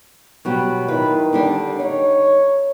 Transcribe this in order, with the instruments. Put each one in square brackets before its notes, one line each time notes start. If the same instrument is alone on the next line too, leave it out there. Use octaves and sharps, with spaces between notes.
[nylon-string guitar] B2 F#3 G3
[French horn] D#3 [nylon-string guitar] E4 F4 B4
[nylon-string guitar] D3 G3 D4
[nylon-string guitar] D#4 [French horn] C#5